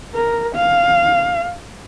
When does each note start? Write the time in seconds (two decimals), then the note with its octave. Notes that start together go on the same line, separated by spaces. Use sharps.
0.15 A#4
0.55 F5